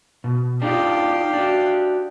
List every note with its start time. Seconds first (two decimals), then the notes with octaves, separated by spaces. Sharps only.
0.24 B2
0.62 D4 D#4 F4 G4 F5
1.33 D4 F#4